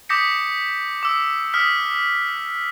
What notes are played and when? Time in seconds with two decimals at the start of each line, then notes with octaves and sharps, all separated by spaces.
0.09 D6 D#6 G6 A#6 B6 C#7
1.03 D6 E6
1.54 D#6 F6 B6